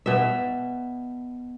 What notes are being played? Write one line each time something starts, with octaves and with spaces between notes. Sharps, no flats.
B2 E5